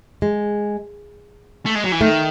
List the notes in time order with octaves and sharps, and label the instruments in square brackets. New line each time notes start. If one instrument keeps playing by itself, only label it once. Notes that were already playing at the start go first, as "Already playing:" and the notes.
[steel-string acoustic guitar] G#3
[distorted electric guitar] A3
G#3
F#3
E3
[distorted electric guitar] D#3 [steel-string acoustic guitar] A3